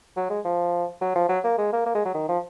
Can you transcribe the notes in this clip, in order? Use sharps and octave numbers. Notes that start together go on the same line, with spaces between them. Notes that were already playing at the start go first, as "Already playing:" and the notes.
F#3
G#3
F3
F#3
F3
F#3
A#3
G#3
A#3
A#3
G#3
F#3
D#3
F3